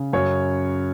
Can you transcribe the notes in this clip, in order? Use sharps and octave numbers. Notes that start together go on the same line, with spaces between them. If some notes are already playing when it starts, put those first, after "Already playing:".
Already playing: C#3
F#2 C#5